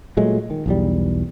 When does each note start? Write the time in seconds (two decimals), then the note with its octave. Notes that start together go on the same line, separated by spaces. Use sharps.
0.17 A#2 F#3 G#3 A3
0.50 D#3
0.66 B1 E2 G3